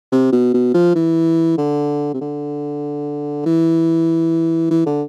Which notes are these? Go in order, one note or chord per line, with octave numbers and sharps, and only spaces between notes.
C3
B2
B2
F3
E3
D3
C3
D3
E3
E3
D3